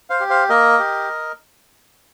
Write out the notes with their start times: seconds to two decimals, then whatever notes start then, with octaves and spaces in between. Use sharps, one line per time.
0.10 C5 F5
0.20 G4
0.30 C5 F5
0.49 A#3 A#4 D#5
0.79 G4